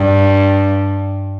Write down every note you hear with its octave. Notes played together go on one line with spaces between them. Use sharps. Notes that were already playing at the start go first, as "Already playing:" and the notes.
Already playing: G2